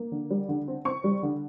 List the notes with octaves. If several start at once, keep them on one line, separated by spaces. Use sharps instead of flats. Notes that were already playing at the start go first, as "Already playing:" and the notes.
Already playing: A#3
D3
G3
D3
C4
C4 C#6
G3
D3